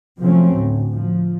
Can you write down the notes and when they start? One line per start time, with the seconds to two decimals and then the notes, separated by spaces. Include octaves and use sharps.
0.20 C3 F3 F#3 A3 C4 C#4
0.53 D2 A2
0.96 F3